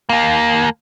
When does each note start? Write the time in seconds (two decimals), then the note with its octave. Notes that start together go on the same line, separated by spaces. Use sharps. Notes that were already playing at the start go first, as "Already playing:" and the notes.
0.09 D#2 A#3